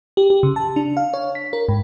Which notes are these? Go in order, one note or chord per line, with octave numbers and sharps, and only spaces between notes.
G4
G4
C#3
A5
D4
F5
C#5
B6
A#4
G#2